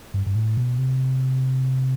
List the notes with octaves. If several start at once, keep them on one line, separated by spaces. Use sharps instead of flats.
G2
G2
A2
B2
C3